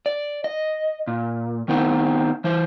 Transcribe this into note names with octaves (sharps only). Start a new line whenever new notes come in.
D5
D#5
A#2
D#3 B3 C4 D#4
E3 C5